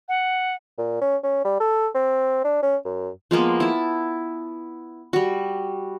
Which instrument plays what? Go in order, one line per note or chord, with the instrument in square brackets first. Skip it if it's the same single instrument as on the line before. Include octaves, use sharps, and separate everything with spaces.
[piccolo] F#5
[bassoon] A#2
C#4
C#4
G3
A4
C4
D4
C#4
F#2
[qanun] F3 G#3 A#3 B3
E4 A5
G3 F#4